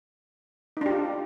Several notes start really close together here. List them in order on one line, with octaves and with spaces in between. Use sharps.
D#4 D4 G4 F4